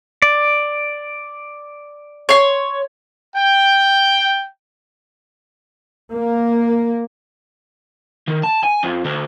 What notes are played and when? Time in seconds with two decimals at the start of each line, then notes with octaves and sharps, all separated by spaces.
0.22 D5
2.29 C#5 C6
3.36 G5
6.14 A#3
8.28 D#3
8.43 A5
8.63 G#5
8.83 F2
9.05 D2